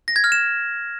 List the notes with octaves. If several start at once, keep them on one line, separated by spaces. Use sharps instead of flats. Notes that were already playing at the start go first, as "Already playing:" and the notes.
A#6
G#6
F6
E7